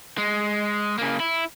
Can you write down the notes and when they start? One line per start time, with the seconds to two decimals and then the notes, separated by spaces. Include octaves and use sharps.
0.18 G#3
0.98 C#3 A#3
1.20 E4